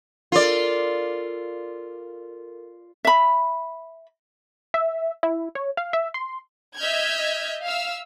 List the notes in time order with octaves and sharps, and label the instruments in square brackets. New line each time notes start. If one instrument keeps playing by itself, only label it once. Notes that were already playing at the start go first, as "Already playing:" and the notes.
[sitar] F4 D5 [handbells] A4 A#4
[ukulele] E5 B5
[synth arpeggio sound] E5
E4
C#5
F5
E5
C6
[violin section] D#5 E5 F6 G6 G#6
E5 F5 E6 F6